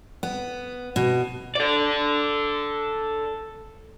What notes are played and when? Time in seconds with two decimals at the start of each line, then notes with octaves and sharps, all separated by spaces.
0.23 B3
0.96 B2
1.55 A4 D5